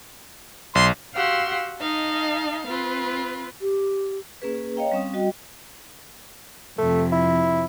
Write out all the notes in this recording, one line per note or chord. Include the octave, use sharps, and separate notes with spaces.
B1 C6
F#4 G4 F5 F#5 C6 E6
D#4 D#5 F5 A5
C4 F4 B4
G4
A#3 C#4 G#4 B4
C#5 D#5 F5 G5 A#5
G3 C4 C#4 F5 D#6
G3 F#4 D#5 G5
F2 C3 A3
E4